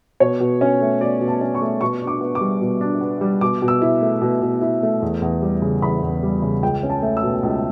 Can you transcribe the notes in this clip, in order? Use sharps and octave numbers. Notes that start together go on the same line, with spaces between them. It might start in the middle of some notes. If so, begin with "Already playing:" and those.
B2 C#5
B2
C#4
A3
B2 D5
B2
A5
C#4
C#6
A3
B2 C#6
D4
D6
B3
D6
G3
B2
D4
B3
G3
B2 D6
B2
E6
E4
A3
B2
B2
E4
A3
E2
E2
G3
C#3
E2 B5
E2
G3
C#3
C#2 G5
C#4
A5
A3
E6
B2
C#2